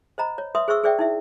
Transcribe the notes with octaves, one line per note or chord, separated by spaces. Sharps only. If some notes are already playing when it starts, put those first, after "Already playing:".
C5 D#5 A#5 B5
C#5
B4 E5 C6 D#6
G#4 C5 E5 C#6 E6
G#4 C5 D5 E5 G5
D#4 E4 E5